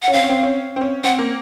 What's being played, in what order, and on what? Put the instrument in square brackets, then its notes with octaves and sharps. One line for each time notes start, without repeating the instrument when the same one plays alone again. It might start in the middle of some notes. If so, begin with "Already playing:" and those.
[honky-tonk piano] C#4 [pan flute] F#5
[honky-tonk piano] C4 [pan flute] F5
[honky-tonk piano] C#4
C4
C#4
C4
C#4
[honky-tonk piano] C4 [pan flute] F#5
[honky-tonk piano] A#3